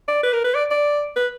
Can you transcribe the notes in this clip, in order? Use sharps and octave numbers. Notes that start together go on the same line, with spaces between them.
D5
B4
A#4
B4
D5
D5
B4